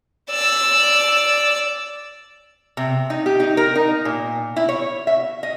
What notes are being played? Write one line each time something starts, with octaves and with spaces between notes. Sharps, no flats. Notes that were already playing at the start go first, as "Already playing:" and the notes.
D5 E6
C3
D#4
G4
D#4
A#4
D#4
A#2
E4
C#5
E5
D#5